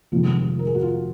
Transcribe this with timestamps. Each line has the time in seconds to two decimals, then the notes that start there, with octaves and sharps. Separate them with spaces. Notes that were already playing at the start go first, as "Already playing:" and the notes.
0.12 F1 F2 C3 D#3 G#3 F4
0.59 A#4
0.67 G#4
0.75 F#4
0.82 F4